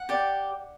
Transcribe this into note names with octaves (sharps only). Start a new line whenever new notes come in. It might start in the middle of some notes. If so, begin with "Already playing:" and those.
Already playing: F#5
G4 D5